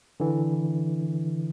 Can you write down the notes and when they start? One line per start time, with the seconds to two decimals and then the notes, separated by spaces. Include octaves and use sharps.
0.20 D3 E3